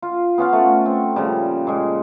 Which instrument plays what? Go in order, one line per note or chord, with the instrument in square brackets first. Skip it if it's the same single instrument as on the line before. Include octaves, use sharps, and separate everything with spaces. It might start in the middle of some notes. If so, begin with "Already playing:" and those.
[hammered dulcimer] F4
B3 C#4 F4 F5
A3 F#5
C4
A#2 C#3 F3 G3
A#2 G#3